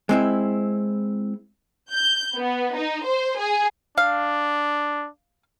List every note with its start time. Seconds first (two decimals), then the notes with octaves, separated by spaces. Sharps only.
0.09 G#3 C4 E4
1.91 G6
2.36 B3
2.76 D#4
3.06 C5
3.40 G#4
3.98 D4 F5